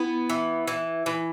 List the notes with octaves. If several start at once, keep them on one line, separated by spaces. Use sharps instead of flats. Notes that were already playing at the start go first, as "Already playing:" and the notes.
Already playing: B3 E4
E3
E3
E3